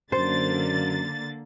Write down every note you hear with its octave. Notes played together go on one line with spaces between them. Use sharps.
F#2 D3 A#3 C5 A6